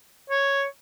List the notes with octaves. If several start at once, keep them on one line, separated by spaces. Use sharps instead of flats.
C#5